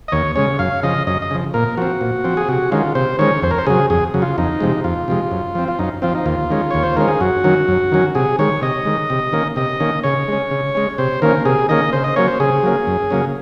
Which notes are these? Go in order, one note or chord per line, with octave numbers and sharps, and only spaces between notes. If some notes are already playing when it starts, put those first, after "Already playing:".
D#5
D#2 C#5
C#3 G#3 C#4 C#5
F#2 F5
C#3 F3 D#5
F#2 D#5
D#5
C#3 F3
A#2 A#4
F3 C4 F#4
A#2
F3 C4
G#4
C3 F#4
D#3 G#3 C#4 F4
C3 C5
D#3 G#3 C#4 C#5
F2 C5
A#4
C5
C#3 F#3 G#4
F2 G#4
C#3 F#3
F4
F2 D#4
C3 F3 G#3
F2 F4
C3 F3 G#3
F#2
F3 C4
F4
F#2 D#4
F3 C4 F4
D#4
D#2 F4
D#3 G#3 C#4
D#2 C#5
C5
D#3 G#3 C#4 A#4
G#4
F#2 F#4
D#3 F#3 C#4
F#2
D#3 F#3 C#4
C3 G#4
D#3 G#3 C#5
C3 D#5
D#3 G#3
C3
D#3 A#3 C#4
C3 D#5
D#3 A#3 C#4
C#3 C#5
G#3 C#4
C#3
G#3 C#4
C3 C5
D#3 A#3 C#4 A#4
C3 G#4
D#3 A#3 C#4 D#5
C#3 C5
D#5
F#3 A#3 C#4 C#5
C5
C#3 G#4
F#3 A#3 C#4
F#2
C#3 F#3 A#3 C#4